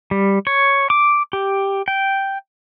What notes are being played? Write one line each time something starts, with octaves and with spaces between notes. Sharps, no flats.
G3
C#5
D6
G4
G5